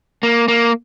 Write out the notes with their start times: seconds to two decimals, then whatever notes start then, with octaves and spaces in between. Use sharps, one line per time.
0.23 A#3
0.48 A#3